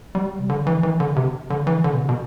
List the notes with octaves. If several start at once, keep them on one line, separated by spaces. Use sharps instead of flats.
G3
C3
D3
E3
E3
D3
C3
D3
E3
D3
B2
C3
B2